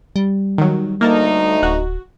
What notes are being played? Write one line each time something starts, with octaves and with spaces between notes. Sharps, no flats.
G3
D#3 F#3
D2 A3 A#3 D#4 A#4 A5
D1 F#4